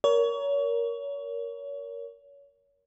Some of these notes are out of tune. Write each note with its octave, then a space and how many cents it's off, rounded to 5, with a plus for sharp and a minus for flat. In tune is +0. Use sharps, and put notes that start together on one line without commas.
A#4 +10 C#5 +30